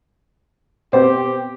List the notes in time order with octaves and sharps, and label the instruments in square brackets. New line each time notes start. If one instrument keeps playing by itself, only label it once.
[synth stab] B2 B3 C4 [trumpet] G4 [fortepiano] C5